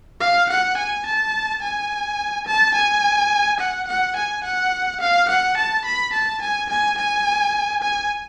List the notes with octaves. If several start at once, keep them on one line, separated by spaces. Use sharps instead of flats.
F5
F#5
G#5
A5
G#5
A5
G#5
F#5
F#5
G#5
F#5
F5
F#5
A5
B5
A5
G#5
G#5
G#5
G#5